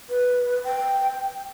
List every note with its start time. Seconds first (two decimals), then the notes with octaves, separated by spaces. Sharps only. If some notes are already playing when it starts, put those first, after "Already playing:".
0.09 B4
0.64 G5